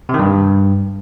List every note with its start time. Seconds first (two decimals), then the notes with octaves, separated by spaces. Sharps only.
0.09 C3
0.14 D#3
0.19 G2